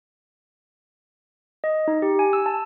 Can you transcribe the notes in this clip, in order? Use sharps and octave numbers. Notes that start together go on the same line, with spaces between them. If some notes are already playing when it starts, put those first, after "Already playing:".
D#5
D#4
G4
G#5
E6
A5